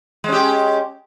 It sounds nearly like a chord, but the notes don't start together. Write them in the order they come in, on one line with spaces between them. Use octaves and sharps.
G#3 C#4 G4